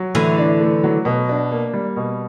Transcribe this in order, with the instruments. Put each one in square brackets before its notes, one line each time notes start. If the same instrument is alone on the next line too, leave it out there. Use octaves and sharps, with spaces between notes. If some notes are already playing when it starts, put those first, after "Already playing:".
Already playing: [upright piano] F#3
[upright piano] A2 [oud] D3 E3
[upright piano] D4
A3
F#3
B2
D4
A#3
G3
B2